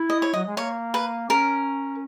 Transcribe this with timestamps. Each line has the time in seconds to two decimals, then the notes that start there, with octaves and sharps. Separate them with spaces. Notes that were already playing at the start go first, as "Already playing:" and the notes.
Already playing: E4
0.10 D#5
0.22 C#5
0.34 F#3 D#5
0.46 G#3
0.57 A#3 C#5
0.94 B4
1.30 C#4 A#4